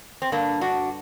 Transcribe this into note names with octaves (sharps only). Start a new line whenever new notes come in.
C4
G2 D3 A#3 D4
D4 F#4